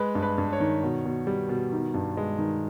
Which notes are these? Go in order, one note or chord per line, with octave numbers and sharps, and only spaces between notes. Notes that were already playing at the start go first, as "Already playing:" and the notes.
Already playing: G#3 B4
G2
B4
G2
C#5
D#3
B2
B2
G3
B2
D#3
G2
G#3
D#3